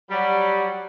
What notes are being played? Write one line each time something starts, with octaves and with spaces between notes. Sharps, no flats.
F#3 G3